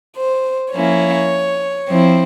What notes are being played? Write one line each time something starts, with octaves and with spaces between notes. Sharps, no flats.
C5
F3 A#3 C#4 E4 C#5
F3 C4 E4